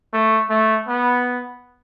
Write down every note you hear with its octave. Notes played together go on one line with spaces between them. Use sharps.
A3
A3
B3